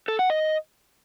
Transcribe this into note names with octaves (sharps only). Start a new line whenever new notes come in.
A4
F#5
D#5